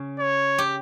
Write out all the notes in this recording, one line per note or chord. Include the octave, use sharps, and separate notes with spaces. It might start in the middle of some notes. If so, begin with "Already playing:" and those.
Already playing: C#3 C#4
C#5
G4